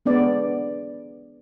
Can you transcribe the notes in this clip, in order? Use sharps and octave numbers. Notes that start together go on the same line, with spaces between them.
G#3 B3 D4 D5